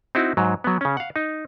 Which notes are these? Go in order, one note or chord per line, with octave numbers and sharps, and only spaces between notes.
C4 D#4 E4 F#4
G#2 F#3
F#3 B3
C#3 C#4
F5 F#5
D#4